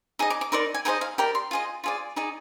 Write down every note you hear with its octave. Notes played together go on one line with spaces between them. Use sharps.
D#4 G#4 D#5
D6
D6
D#4 A#4 D5 C6
G#5
D#4 G#4 C5 D#5 G5
F5
G4 A#4 D5 G5
C6
F4 G#4 D#5
F4 G#4 D5
D#4 G#4 D5 G#5